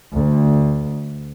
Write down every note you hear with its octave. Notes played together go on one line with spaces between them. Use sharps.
D2